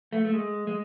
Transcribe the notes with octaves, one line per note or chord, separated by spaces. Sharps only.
A3
A3
G#3
G#3